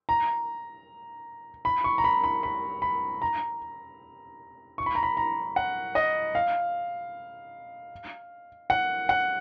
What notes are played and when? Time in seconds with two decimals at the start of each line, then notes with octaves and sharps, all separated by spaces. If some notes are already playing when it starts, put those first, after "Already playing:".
0.09 A#5
1.65 B5
1.84 C#6
1.98 A#5
2.04 B5
2.24 B5
2.43 B5
2.82 B5
3.22 A#5
4.78 C#6
4.86 B5
4.95 A#5
5.03 B5
5.17 A#5
5.56 F#5
5.95 D#5
6.35 F5
8.70 F#5
9.09 F#5